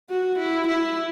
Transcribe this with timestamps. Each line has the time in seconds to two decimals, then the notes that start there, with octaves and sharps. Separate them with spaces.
0.10 F#4
0.38 E4
0.67 E4